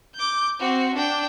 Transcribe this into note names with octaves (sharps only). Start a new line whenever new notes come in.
D6 G6
C4 F#4
D4 G5